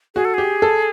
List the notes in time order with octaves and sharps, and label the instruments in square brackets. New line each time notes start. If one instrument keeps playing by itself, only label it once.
[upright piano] F#4 [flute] G#4
[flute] A4
[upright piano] G4 [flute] G#4
[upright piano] A4